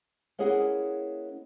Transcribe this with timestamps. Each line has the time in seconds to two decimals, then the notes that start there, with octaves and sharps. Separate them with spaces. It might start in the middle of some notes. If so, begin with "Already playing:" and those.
0.39 A#3 C#4 E4 G#4 D#5 F#5